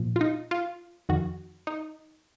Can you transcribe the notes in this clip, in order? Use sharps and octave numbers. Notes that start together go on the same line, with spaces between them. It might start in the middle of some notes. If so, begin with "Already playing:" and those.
Already playing: A#2 F3
F4
D#4
F4
F2 D#3 F#4
D#4